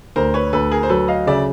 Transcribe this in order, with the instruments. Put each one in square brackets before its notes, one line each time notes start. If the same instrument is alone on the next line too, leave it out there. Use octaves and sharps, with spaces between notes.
[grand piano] D2 [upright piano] A#4 C5
[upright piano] B4 C#5
[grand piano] D2 [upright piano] A4 B4
[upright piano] G#4 A#4
C5
[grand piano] F#3 [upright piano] A4 B4
[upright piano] D#5 F5
[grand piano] C#3 [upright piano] D5 E5